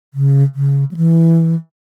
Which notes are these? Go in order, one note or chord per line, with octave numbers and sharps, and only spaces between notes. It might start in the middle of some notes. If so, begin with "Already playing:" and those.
C#3
C#3
F#3
E3